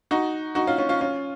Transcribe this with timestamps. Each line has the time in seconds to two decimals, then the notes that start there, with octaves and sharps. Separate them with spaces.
0.11 D#4 F#4
0.55 D#4 F#4
0.67 C#4 F4
0.78 C#4 F4
0.89 C#4 F4
1.01 C#4 F4